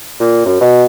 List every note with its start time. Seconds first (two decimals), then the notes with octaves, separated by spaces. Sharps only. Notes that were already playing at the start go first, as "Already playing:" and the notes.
0.20 A#2
0.46 F#2
0.61 B2